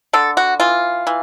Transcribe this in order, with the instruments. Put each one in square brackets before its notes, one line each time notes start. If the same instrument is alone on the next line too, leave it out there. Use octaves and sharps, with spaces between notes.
[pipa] D3 A4
F#4
E3 F4
E3